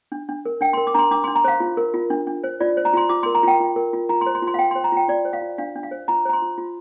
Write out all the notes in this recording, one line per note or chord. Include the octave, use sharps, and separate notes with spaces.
D4
D4
A#4
D4 G5
C6
A#4
D6
D4 A#5 C6
D4 D6
C6
D4
A#5
C5 F5
F4
A#4
F4
D4
D4
C5
F4 D5
C5
A#5
F4 C6
F4 D6
C6
A#4
A#5
F4 G5
F4
A#4
F4
F4 A#5
C6
C5
C6
F4
C6
F5
F4 G5
C6
C5
A#5
F4 G5
F4 D5
C5
F5
F4
D4 F5
D4
F5
C5
F4 A#5
C5 A#5
C6
F4
F4